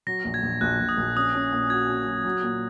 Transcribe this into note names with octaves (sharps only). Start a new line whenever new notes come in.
F#3 A#6
A#1
G#6
A#1
A#1 F#6
A#1
D#6
A#1
C#4 D#6
C#4
A#2
F#4 G#6
C#4
F#3
F#3
A#2